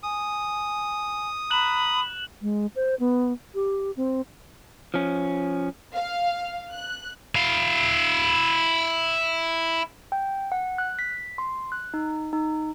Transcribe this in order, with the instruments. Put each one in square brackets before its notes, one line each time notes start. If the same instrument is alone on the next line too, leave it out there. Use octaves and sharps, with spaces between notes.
[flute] G#5 [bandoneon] D#6
[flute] A#5 [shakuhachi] B5 [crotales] F#6 E7 F#7
[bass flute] G#3
C5
B3
G4
C4
[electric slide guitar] F3 C#4
[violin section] F5
F#6
[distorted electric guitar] E4 F5
[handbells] G5
F#5
F#6
B6
C6
F#6
D#4
D#4